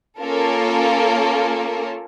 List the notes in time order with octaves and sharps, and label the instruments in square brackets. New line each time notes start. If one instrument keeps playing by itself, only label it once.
[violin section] A#3 C#4 F4 A4 A#4